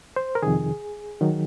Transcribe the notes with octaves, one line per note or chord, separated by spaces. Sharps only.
C5
A#4
F2 C3 D#3 G#4
D#3 F#3